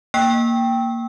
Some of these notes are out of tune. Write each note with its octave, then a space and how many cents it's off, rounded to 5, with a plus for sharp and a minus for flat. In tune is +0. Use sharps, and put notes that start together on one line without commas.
A#3 +0 G5 +0 E6 -25